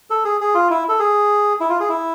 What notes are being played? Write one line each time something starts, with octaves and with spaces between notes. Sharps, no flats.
A4
G#4
G#4
F4
E4
A4
G#4
E4
F4
G#4
E4